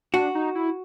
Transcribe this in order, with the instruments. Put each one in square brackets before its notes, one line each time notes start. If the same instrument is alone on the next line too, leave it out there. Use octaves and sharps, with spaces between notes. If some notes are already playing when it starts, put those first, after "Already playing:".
[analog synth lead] D4 [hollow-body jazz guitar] F#4
[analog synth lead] D#4
E4